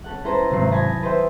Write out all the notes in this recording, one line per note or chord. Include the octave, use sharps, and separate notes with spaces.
C#4 A4 F#5
C#4 E4 A4 B4 C5 A#5
G#1 C3 F#3 C7
G#5 A5 B5 D#6 A#6
B4 C5 D#5 E5 G5